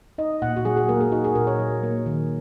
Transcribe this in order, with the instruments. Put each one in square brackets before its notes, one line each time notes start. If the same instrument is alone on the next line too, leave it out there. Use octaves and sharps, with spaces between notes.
[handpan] D#4 D#5
A#2 F#5
F#4
F#3 G#4
G#4
A#3 A#4
G#4
D#4 F#4
G#4
A#2 A#4
C#5
F#3
A#3
D#3